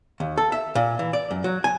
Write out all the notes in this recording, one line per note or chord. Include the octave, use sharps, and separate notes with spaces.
D#2
A4
E5
A#2
E3
D5
F#2
F#3
G#5